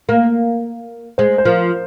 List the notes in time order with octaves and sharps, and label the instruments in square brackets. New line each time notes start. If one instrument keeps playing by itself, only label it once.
[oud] A#3
[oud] G#3 [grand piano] C5
[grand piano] C5
[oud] F3 [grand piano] A#4